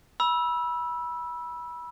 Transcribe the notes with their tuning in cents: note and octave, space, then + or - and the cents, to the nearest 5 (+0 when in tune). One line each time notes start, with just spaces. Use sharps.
B5 -25 E6 +0